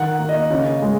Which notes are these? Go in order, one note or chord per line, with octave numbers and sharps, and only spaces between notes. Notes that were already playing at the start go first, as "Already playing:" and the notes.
Already playing: D#3 F#5
A#3
D#5
C#3
G#3